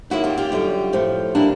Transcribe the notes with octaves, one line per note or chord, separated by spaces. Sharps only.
F#2 D#3 F#3 A#3 E4 F#4
F4 G4
F4 G4
F#2 D3 G3
A2 F3 A3
A#2 G3 A#3 D4 E4